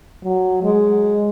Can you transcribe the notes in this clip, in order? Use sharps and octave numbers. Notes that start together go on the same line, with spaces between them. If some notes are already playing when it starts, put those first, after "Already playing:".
F#3
G#3